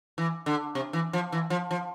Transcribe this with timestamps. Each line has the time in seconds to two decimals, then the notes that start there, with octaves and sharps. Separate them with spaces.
0.18 E3
0.46 D3
0.75 C3
0.93 E3
1.13 F3
1.32 E3
1.50 F3
1.71 F3